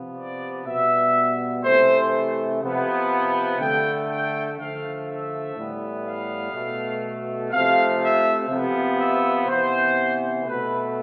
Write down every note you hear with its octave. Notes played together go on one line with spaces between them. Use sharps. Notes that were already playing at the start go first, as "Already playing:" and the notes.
Already playing: C3 F3 B3
D5
B2 G3 B3 E5
C3 E3 A3 C5
C3 F3 B3
D3 A3 G5
G5
D3 F3 A3 F5
E5
A2 E3 G3 B3
F5
B2 A3
C3 F3 A3 F5
E5
C3 F3 B3
E5
C3 E3 B3 C5
B2 A3 B4